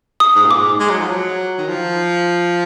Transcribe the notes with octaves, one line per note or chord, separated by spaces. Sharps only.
D#6
G#2
A#2
G#2 D6
G#3
F#3
F3
F#3
D#3
F3